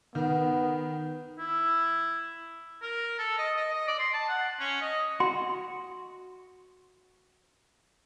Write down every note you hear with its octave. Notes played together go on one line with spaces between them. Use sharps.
D#3 B3
E4
A#4
A4
D#5
D#5
D#5
D5
C6
A5
F#5
C#4
D#5
F#4 C6